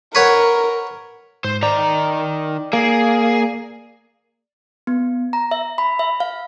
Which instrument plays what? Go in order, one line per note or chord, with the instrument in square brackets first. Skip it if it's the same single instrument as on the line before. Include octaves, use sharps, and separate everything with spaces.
[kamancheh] A#4 [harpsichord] B4 C#5 F#5
[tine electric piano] G#2 [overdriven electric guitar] C5
[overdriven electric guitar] D#3 A#5 [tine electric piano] D5
[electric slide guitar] A#3 [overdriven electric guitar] G#4
[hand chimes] B3
A#5
E5
B5
E5
F5